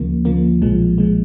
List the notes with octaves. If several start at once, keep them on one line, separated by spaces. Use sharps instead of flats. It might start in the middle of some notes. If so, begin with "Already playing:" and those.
Already playing: D2 C#3 F3 A#3
D2 C#3 F3 A#3
B1 A#2 F3 G#3
A#2 F3 G#3